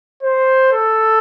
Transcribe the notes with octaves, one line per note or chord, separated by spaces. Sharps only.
C5
A4